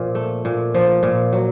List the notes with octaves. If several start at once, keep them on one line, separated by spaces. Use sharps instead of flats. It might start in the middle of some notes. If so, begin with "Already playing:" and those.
Already playing: A#2 F3
A3
A#2
F3
A#2
F#3